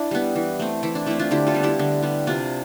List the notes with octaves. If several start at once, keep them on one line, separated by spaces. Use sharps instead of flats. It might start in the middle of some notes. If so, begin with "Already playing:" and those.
Already playing: D4 E4
G3 B3
E3
A3 C4
E3 E4
D4
A3 C4 E4
D4 F4
D3 E4 G4
F4 A4
G3 B3
E4 G4
D3
G3 B3
C3 D4 F4